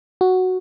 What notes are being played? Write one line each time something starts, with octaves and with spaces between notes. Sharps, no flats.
F#4